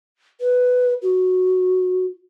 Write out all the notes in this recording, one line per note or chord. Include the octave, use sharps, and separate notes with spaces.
B4
F#4